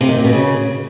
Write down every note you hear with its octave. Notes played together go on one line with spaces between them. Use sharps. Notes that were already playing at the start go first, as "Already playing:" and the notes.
C3
D#3
A#2
B2
C#3